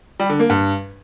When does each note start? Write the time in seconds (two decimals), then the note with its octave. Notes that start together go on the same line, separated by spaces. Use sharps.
0.20 G3
0.30 D3
0.40 A#3
0.49 G2